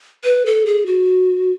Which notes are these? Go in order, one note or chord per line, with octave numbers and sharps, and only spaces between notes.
B4
A4
G#4
F#4